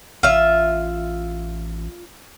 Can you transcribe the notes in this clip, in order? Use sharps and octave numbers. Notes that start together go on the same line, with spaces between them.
A1 F4 E5